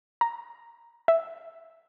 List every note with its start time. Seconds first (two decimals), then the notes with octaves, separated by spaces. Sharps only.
0.21 A#5
1.08 E5